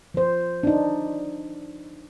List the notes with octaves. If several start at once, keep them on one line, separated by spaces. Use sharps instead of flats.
F3 C5
D4 D#4